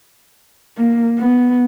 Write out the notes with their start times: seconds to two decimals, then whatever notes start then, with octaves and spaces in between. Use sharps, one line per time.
0.78 A#3
1.19 B3